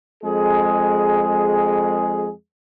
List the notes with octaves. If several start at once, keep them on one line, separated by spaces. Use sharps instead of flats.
F2 G#3 G#4